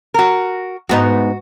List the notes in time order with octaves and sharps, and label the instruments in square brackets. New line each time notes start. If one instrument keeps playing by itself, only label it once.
[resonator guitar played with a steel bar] F#4 A#4
[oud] G#2 B3 D#4 [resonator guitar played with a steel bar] F#4